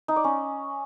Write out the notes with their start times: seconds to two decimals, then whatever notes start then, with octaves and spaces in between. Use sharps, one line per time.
0.08 D#4
0.16 D5
0.24 C#4